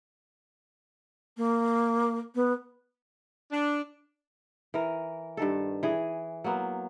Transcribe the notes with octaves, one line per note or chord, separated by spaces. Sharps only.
A#3
B3
D4
E3 A#4
G2 D#3 A4
E3 G#4
F#3 A#3 B3